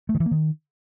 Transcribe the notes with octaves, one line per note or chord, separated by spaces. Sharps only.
A3
D#3
E3
A#3
D#3